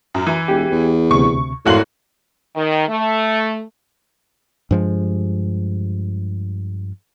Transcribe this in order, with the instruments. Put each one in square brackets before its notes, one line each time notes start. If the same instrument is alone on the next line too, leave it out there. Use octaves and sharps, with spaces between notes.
[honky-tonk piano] F#2
E3
[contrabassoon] E1 [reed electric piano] G4
[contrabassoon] E2
[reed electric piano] D2 C3 [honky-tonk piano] C#6
[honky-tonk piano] G#1 F#4 F#7 [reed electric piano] F2 F5 C6 [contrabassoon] A2
[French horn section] D#3
A3
[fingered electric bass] G2 F3 G#3